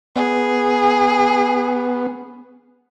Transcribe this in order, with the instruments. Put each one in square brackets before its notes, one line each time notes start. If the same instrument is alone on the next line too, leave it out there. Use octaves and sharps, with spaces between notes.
[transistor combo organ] B3 [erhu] G#4